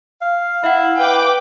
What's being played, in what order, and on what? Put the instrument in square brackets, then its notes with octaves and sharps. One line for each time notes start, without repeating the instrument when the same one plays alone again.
[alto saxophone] F5
[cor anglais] E4 [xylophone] E5 F#5
[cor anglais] B4 [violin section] G5 D6